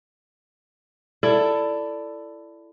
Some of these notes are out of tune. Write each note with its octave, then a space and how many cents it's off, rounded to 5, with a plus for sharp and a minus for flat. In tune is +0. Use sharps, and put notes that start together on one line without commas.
E4 +20 A4 +10 D5 +0